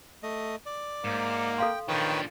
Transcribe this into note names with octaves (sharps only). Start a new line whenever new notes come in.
A3 D#5
D5
G#2 A#3
A4 F5 G5 C6
D#3 F3 D4 B4 C#5 G5